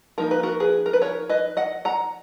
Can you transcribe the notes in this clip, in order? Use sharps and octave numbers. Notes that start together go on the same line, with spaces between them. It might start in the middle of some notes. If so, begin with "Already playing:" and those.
F3 A#3 D#4 A#4
B4
F#4 A#4
G#4 B4
A#4
B4
A#4 C#5
B4 D#5
D#5 F#5
F#5 A#5